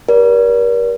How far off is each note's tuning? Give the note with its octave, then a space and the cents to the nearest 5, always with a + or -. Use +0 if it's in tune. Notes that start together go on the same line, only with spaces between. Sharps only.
G4 +0 A#4 +40 D5 -25